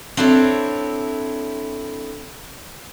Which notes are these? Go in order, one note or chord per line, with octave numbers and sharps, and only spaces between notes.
C4 D4 E4 A4 C#5